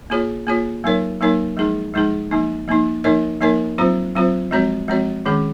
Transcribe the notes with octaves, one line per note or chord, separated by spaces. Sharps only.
A#3 F4 G#4 C#5
A#3 F4 G#4 C#5
F#3 A#3 D#4 A#4 C#5
F#3 A#3 D#4 A#4 C#5
F3 G#3 D#4 G#4
F3 G#3 D#4 G#4
F3 A#3 D#4
F3 A#3 D#4
F3 A#3 D#4 A#4 C#5
F3 A#3 D#4 A#4 C#5
F#3 C4 F4 C5
F#3 C4 F4 C5
F3 G#3 C4 F#4 C#5
F3 G#3 C4 F#4 C#5
D#3 G#3 C#4 G#4